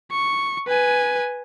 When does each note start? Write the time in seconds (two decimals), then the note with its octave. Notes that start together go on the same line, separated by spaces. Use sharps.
0.11 C#6
0.68 B4 G#5